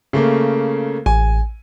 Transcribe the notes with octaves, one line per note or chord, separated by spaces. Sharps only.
C#3 A3 A#3
A1 G#5